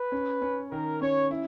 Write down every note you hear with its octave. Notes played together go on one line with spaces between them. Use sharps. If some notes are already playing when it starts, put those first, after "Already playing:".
Already playing: B4
C#4
C#4
D#3 A#4
C#4 C#5
E4